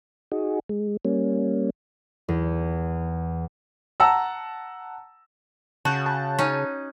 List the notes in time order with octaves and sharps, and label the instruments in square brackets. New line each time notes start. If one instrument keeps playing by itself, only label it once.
[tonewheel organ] D#4 F#4 G#4
G#3
G3 A#3 C#4
[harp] E2
[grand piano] F#5 A5 A#5 E6
[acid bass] C#3 [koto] F#4 [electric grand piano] A5 F#6 G6
[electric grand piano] A5
[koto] C#4 D#4